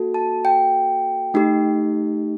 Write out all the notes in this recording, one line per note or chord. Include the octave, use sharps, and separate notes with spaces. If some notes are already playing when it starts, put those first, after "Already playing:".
Already playing: A#3 F#4 A4
A5
G5
A3 D#4 G4